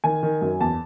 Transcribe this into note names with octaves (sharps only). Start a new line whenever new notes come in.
D#3 G#5
D#3
F#2
E2 A5